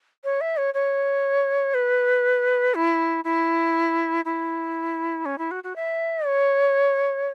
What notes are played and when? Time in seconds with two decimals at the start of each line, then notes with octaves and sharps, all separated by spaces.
0.24 C#5
0.41 E5
0.57 C#5
0.74 C#5
1.74 B4
2.75 E4
3.24 E4
4.25 E4
5.26 C#4
5.38 E4
5.51 F#4
5.64 F#4
5.76 E5
6.26 C#5